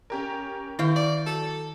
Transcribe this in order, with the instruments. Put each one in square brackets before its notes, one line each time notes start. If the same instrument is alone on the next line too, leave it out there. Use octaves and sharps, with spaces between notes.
[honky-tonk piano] C#4 G4 A#4
[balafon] D#3 [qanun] E4 F5 G5 [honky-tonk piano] C#6 G6
[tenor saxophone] D5
[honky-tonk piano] F#3 [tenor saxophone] A4